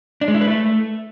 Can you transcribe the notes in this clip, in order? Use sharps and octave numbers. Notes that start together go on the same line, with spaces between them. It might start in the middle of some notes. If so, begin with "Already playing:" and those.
D4
G#3
E4
B4
A3